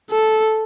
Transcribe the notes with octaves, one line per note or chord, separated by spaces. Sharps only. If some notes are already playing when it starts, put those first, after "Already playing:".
A4